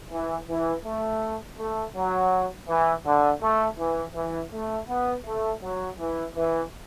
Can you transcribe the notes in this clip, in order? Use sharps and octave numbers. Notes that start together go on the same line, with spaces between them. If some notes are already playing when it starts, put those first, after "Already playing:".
E3
E3
A3
A3
F#3
E3
D3
A3
E3
E3
A3
B3
A3
F#3
E3
E3